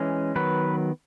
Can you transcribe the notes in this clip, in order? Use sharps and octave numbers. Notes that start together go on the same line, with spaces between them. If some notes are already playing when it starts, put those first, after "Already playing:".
Already playing: E3 G#3 C#4
D#3 F#3 B3 B4